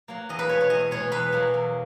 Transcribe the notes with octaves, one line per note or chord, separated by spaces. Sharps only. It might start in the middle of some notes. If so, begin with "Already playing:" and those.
F#3 A#3
E2 D#5
B4
B2 G#3 C#5
C#5
E2 D#5
B2 G#3 C#5
E2 B4
B2 F#3 A#3
E2